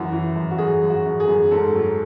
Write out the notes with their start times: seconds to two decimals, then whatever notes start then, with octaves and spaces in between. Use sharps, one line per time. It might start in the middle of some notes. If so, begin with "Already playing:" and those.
Already playing: F#2 E3 F#4
0.13 E3
0.36 F#2
0.51 F#4
0.58 F#2 G#4
0.82 F#2
0.90 F#4
1.06 F#2
1.20 G#4
1.28 F#2
1.51 G#2 A4
1.75 F#3